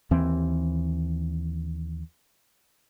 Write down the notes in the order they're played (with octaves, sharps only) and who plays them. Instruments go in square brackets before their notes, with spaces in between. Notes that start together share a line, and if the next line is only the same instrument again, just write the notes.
[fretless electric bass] D#2 E3 C4